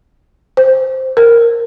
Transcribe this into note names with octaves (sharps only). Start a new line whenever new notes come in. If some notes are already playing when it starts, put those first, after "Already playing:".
C5
A#4